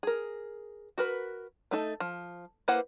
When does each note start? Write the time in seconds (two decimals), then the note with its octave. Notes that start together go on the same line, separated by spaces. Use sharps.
0.03 G#4 A#4
0.98 F#4 A#4 B4
1.71 A3 D#4 A4
2.00 F3
2.68 A#3 E4 B4 C5 F#5